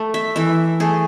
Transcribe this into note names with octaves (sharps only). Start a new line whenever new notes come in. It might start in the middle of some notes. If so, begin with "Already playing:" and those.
Already playing: A3 A4
E5
E3 E5
A3 G#4